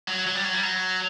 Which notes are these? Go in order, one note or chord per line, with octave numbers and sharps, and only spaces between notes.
F#3
F#3
G3
F#3
G3
F#3